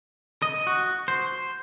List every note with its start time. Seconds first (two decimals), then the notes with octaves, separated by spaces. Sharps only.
0.42 D#5
0.67 F#4
1.08 C5